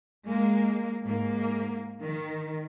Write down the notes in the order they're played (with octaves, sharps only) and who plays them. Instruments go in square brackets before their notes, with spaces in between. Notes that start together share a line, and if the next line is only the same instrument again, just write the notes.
[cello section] G#3 A#3
G#2 A#3
D#3